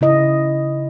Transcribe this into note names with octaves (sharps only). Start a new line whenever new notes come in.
C#3 E4 D#5